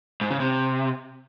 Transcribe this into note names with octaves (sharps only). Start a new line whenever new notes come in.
G#2
C#3
C3